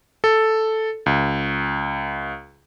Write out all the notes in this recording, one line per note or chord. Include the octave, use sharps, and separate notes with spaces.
A4
C#2